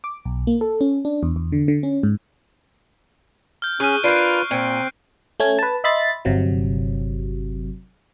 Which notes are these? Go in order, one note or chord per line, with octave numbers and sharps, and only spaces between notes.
D6
B1
A#3
A4
C#4
D4
E2
E2
D3
D3
C#4
G#2
F6 G6
C#4 G#4 C#6 F#6 D#7
D4 F4 A#4 B4 G6 C7 D7
A#2 C4
A3 C#4 G#6
B4 A5
D#5 E5 B5 C6 A6
G1 C3 F#3